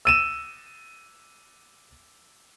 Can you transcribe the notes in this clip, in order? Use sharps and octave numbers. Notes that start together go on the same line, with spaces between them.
E6 D#7 E7